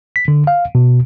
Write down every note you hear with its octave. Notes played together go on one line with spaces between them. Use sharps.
B6
D3
F5
B2